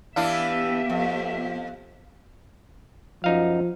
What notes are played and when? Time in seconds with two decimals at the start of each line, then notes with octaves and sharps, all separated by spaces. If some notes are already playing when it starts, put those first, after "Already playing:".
0.16 E3 B3 D4 E4 G4 E5 F5
0.90 F2
3.24 F#2 F3 D#4 F5